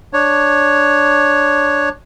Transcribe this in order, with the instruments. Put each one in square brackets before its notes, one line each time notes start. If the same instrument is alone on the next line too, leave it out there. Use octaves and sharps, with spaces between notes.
[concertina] D4 C#5